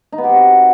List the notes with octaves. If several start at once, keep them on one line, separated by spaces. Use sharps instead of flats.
D#4
B3
G4
C4
F#4